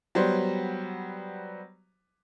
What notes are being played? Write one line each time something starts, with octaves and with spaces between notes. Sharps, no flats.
F#3 G3 B3 C5